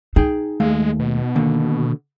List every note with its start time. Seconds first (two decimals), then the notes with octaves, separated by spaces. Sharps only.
0.16 D#4 G#4 G5
0.60 D#2 G#3 A3 F5
0.99 B2
1.36 D3 D#3 A#3